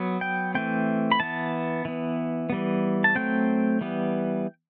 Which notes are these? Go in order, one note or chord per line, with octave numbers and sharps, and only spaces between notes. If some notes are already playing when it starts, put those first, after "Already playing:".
Already playing: F#3 B3
G5
E3 A3 C4 G5
B5
E3 B3 A5
E3 B3
E3 G3 B3
A5
F#3 A3 C4 G5
E3 G3 B3